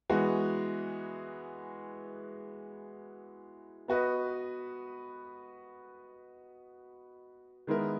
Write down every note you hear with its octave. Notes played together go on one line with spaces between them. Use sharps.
E3 G#3 B3 F#4
B3 F#4 B4 D#5
D#3 G#3 B3 E4 A#4